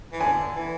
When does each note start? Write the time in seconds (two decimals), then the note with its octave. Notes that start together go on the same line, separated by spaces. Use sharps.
0.12 E3
0.20 D3 G#5
0.56 E3